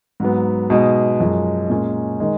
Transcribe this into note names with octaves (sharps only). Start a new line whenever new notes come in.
G#2 F#3 B3
B2 G#3 D#4
F#2 F3 G#3
A#2 G#3 C#4
D#3 G#3 D#4